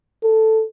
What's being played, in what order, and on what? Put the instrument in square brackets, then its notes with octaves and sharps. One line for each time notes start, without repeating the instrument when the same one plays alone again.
[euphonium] A4